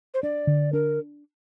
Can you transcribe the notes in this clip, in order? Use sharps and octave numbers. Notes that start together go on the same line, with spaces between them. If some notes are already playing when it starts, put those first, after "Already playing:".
C5
D4 D5
D3
D4 A#4